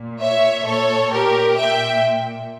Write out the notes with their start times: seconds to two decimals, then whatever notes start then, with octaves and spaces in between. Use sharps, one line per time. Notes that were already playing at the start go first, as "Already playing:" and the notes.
Already playing: A#2
0.20 C#5 E5
0.65 A#2 A4 C#5
1.11 G4 A#4
1.57 A#2 E5 G5